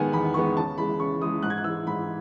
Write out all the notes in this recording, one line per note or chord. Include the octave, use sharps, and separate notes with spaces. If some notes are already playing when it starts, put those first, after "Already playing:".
Already playing: D#3 G#3 B3 F#5 G#5
E2 B5
D#3 G#3 B3 C#6
C#3 A5
E3 G#3 B5
C#3 C#6
E3 G#3 D#6
G#2 F#6
G#6
F#6
E3 G#3 E6
G#2 B5